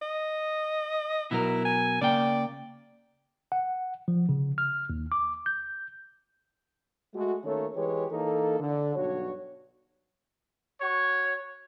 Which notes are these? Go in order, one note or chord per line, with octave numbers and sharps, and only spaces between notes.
D#5
B2 F#3 E4 A#4
G#5
C#3 A#3 D5 G5
F#5
F3
C#3
F6
D#2
D6
G6
G#3 A3 F#4
D#3 A3 A#3 C#4 A4 C#5
E3 G#3 G4 G#4 B4 C#5
E3 A#3 D#4 A4
D3
B1 G2 F#4 C#5
F#4 C#5